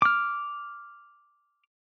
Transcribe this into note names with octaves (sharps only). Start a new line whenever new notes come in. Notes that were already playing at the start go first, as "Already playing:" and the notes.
D6 F6